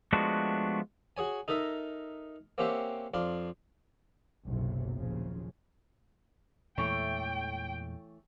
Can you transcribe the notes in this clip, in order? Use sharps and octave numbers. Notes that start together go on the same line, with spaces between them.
F3 G#3 A3 B3 D4 F#4
F#4 G#4 C#5 G#5
D#4 A4 A#4 D#5 E5
A#3 C4 C#4 G4 E5 F#5
F2 D4 F5 C6
F#1 B1 F#2 C3
F#1 D#2 A#2 C#3 F3
E2 A#2 E3 G#3 A3 C#5 G5